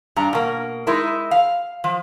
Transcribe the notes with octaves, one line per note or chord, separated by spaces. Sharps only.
G2 D4 A#5
B2 A#3
G#3 D#4 E4 A#4
F5
F3